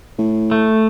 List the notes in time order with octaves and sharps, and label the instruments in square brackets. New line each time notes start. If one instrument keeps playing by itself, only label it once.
[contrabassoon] A2
[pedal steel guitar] A3